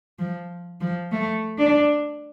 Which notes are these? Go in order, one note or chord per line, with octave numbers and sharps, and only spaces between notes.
F3
F3
A3
D4